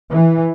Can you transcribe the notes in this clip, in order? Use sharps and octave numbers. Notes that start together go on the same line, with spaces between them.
E3